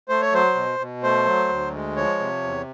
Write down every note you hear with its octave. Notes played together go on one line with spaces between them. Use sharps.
A3 C5
C#5
F#3 C5
B2
B2
A3 C5
F#3
D2
G#3
F3 C#5
C3
E2